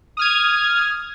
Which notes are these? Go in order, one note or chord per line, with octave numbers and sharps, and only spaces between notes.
D#6 F6 G#6